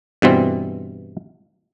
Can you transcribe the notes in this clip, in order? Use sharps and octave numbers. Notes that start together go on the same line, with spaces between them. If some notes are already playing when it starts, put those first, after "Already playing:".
G2 B2 E3 C4